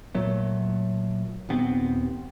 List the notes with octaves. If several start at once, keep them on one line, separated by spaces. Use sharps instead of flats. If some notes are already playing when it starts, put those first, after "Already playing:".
A#2 F#3 A3
D#1 D#2 B3 C4